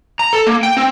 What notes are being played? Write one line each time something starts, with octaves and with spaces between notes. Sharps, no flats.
A#5
A4
A#3
G5
C4